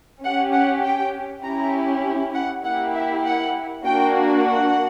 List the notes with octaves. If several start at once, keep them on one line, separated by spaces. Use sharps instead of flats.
C#4 G4 F#5
F#5
G5
C#4 E4 G4 A#5
F#5
A#3 E4 G4 F#5
E5
F#5
A#3 D4 F#4 G5
F#5